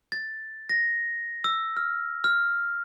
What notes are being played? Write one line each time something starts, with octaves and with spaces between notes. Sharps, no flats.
A6
A#6
E6
F6
F6